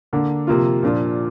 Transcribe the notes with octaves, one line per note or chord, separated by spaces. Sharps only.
D3 A#3 D4
C3 F3 A#3 F4
A#2 F3 D4 F4